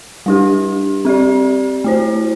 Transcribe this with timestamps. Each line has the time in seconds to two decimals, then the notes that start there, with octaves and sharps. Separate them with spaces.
0.26 G3 D4 G4
1.05 C4 G4 D5
1.84 A3 E4 C5